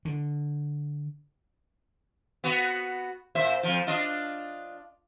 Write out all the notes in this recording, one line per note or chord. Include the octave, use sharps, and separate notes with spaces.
D3
B3 F#4
A#2 C5 E5
F2 F3
D4 F4 D#5